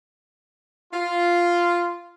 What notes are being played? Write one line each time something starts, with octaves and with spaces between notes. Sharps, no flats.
F4